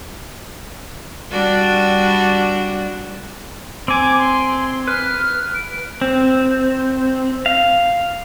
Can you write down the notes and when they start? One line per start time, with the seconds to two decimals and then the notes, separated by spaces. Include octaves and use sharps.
1.31 G3 D4 F#4
3.88 C4 G#5 D6
4.18 C6
4.88 B4 F6
5.55 D7
6.01 C4
7.46 F5